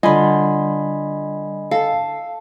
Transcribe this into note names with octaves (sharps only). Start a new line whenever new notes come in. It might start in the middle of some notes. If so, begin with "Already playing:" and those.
D3 G3 F4 D#5 G#5 B5
A4 F5